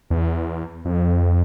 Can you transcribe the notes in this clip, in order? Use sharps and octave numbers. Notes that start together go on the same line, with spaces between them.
E2
F2